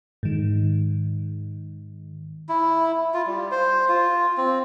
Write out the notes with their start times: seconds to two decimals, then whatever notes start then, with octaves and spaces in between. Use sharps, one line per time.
0.23 G#2 D#3
2.49 E4
3.14 F4
3.26 G3
3.52 C5
3.89 F4
4.37 C4